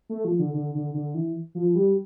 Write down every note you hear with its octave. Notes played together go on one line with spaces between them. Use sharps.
A3
F3
D3
D3
D3
D3
E3
F3
G3